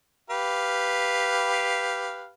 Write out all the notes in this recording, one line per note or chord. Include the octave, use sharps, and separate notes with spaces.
G4 B4 F5